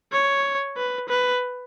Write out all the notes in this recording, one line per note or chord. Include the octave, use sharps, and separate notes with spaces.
C#5
B4
B4